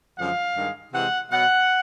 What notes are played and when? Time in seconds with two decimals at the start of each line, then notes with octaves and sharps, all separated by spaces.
0.18 F#2 D3 F3 G#3 F5
0.56 G2 D#3 G#3
0.93 C3 E3 G#3 F#5
1.31 B2 F#3 F#5